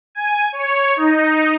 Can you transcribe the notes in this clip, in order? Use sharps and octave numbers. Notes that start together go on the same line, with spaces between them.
G#5
C#5
D#4